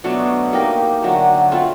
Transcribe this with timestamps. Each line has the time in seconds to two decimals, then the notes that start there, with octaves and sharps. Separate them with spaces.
0.04 B2 F#3 A3 D4
0.53 A#3 D#4 G4 A#4
1.02 D3 F#3 A3
1.51 A3 C4 F4 A4